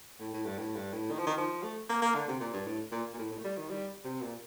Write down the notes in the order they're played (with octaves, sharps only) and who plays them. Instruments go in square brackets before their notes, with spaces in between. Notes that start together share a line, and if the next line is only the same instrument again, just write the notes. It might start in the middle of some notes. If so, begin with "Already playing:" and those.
[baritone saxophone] A2
A2
G2
A2
G2
A2
D#3
F3
D#3
F3
A3
A#3
A#3
D3
C3
A#2
G2
A2
A#2
A#2
A2
A2
A3
G3
D#3
G3
C3
A#2